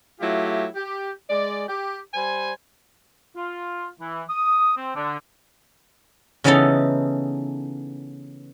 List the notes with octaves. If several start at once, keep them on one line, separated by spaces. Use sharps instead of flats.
F#3 A3 E4 F4 G4
G4
G#3 D5
G4
G3 C5 G#5
F4
E3
D#6
C4
D3
C#3 E3 B3 C#4 D#4 A4